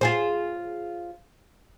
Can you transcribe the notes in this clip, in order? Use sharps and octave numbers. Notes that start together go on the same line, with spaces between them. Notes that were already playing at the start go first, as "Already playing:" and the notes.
F4 G#4 C5